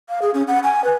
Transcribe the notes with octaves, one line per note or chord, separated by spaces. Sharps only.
F5
G#4
C#4
F#5
G#5
B4